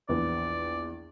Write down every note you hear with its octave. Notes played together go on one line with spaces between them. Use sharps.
A#1 E2 B3 D5